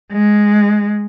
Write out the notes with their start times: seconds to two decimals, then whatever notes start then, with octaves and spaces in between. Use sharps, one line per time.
0.12 G#3